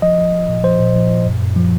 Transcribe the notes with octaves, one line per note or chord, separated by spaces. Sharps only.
F3 D#5
F3
F3
A#2
F3 C5
A#2
F3
A#2
F#2
F#2
F3